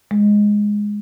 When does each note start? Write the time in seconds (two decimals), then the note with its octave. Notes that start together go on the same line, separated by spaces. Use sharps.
0.11 G#3